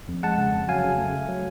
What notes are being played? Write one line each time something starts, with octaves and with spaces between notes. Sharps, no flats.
F2
G#3 F#5 A5
C#3
F2
F#3 F5 G#5
C#3
A3
A3
F#3